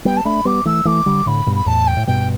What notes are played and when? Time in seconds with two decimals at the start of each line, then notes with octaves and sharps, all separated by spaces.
0.05 G3 B3 G5
0.17 A5
0.25 A3 D4 B5
0.45 G3 B3 D6
0.65 E3 A3 E6
0.85 E3 A3 D6
1.06 D3 G3
1.26 A2 D3 B5
1.46 G2 B2
1.55 B5
1.66 E2 A2 A5
1.87 G5
1.97 A2
2.07 G2 B2 G5